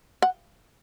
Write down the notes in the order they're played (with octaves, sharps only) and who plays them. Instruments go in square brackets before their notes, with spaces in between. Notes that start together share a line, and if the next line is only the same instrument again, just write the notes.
[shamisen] F#5